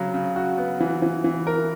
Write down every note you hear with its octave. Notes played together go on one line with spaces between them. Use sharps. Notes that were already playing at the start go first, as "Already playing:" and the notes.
Already playing: C#3 F#3
C#3
F#4
B3
E3
E3
E3
A#4